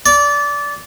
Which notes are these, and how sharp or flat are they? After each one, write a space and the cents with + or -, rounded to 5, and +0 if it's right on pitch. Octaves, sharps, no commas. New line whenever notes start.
D5 -20